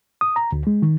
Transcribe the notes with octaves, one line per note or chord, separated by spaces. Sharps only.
D#6
A#5
D2
G#3
D#3